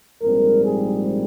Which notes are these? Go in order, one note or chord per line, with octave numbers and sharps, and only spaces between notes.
A#1 G#2 G3 C4 A#4
G#4